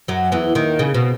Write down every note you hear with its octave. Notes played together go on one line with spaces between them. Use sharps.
F#2 F#3
E2 E3
D#2 D#3
C#3
B2